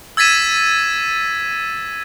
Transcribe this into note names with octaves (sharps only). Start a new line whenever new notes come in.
E6 G#6 A6 B6 D#7 E7